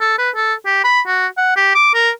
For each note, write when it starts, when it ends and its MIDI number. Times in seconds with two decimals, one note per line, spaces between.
0.01 0.15 69
0.18 0.30 71
0.35 0.54 69
0.66 0.81 67
0.84 1.01 83
1.07 1.27 66
1.38 1.53 78
1.56 1.75 67
1.75 1.93 86
1.94 2.10 70